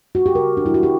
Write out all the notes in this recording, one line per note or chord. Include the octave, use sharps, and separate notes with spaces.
F#4
G4
C#3 A#4
D4
E3 G3 E4
F#4
G4